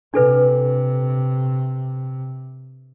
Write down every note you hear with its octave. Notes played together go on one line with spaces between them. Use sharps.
C3 D4 A4 B4